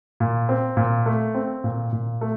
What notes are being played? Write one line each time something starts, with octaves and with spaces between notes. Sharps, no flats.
A#2
C4
A#2
A3
C4
A#2
A#2
A3